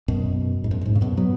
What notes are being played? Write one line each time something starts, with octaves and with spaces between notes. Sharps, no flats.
F#2 B2
G#2
F#2
F#2
G#2
C#3
F#2 B2
F#3 B3